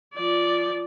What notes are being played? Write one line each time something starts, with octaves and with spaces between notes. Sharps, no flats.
F3 D5